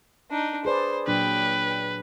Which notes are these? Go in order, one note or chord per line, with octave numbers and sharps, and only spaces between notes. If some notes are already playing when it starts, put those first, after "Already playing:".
D4 D#4
G#4 B4 C5 D5
A#2 F#3 D4 B4 G5